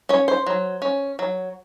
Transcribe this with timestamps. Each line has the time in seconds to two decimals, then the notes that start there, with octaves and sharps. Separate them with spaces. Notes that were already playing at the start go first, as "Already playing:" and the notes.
0.09 C#4 C#5
0.28 C5
0.46 F#3
0.82 C#4
1.19 F#3